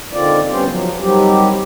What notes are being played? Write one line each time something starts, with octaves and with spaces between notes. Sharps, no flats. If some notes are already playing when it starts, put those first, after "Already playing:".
D3 D#3 C4 F4 D5
G3 B3 C#4 G4 C5
F3 F#3
D#3 F#3 G3 C4 G4